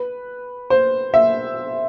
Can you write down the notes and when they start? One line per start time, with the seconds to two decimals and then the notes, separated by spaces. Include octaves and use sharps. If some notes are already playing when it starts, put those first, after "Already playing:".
Already playing: B4
0.70 C5
1.14 E5